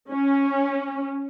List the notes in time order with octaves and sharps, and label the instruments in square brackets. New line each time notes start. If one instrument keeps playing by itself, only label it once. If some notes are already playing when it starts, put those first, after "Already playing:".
[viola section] C#4